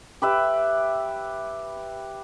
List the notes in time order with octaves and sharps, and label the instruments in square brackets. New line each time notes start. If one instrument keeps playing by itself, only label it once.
[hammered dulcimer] G4 B4 E5